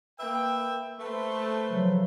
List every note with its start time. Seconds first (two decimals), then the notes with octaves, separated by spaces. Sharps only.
0.20 A#3 B4 E5 G5
0.99 A3 B4 C5
1.68 C#3 F3 F#3